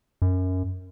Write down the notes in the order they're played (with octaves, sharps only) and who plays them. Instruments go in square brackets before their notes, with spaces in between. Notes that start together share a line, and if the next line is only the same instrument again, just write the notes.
[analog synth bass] F#2